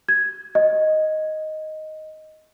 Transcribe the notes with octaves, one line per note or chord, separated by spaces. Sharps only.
G#6
D#5